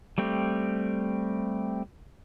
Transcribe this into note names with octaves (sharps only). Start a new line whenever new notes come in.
G3 A3 C4 G4